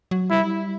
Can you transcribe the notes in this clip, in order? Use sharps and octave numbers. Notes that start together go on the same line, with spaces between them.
F#3
G3 E4